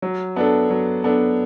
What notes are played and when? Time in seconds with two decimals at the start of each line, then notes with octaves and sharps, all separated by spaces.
0.02 F#3
0.36 B3 D4 A4
0.70 F#3
1.04 B3 D4 A4